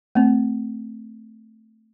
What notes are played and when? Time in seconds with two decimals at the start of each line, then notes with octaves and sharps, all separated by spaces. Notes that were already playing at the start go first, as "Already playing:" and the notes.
0.15 A3 C4